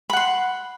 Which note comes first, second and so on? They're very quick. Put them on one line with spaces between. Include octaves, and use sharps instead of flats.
B5 F#5 C6